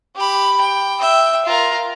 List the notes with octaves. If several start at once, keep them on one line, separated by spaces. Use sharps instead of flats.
G4 B5
G5
E5 G5
F4 A#4